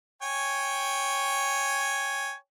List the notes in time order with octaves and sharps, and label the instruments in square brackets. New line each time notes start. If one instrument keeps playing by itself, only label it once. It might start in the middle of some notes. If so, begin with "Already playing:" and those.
[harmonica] C#5 G5 G#5